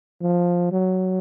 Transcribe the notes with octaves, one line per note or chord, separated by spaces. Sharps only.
F3
F#3